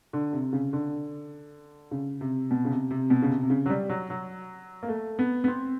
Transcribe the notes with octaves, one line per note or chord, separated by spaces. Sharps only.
D3
C3
C#3
D3
C#3
C3
B2
C#3
C3
C3
B2
C#3
C3
C3
C#3
F#3
G3
F#3
F#3
A#3
A3
B3
B3
C4